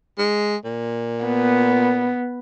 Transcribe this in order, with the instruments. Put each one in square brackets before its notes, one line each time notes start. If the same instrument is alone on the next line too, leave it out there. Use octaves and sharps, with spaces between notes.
[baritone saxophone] G#3
A#2
[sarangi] B3